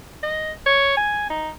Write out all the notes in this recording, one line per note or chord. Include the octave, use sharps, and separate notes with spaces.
D#5
C#5
G#5
D#4